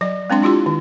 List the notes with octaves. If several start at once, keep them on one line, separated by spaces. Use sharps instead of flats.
F#3 D5
G#3 C4 D4 C6
D4 E4 F4 G4 C6
D#3